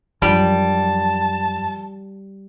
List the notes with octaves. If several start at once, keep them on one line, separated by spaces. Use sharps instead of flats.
F#2 F3 G3 D4 A5